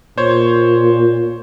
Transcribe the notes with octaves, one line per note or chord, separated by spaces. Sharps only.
A#2 C5 C#5